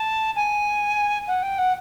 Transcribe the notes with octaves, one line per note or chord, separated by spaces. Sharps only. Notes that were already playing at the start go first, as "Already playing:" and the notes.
Already playing: A5
G#5
F#5
G5
F#5